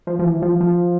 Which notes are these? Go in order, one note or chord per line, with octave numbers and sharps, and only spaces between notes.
F3
F3
E3
F3
F3